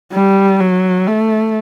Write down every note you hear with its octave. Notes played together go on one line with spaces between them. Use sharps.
G3
F#3
A3